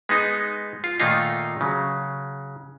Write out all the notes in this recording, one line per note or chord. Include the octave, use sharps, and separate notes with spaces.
G#3 B3 D#4
F4
A#2 D#3 A3 A#3 D#4 F4
C#3 F#3